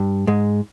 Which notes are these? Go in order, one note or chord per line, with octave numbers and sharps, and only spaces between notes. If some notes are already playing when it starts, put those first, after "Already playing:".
Already playing: G2
G#2 G#3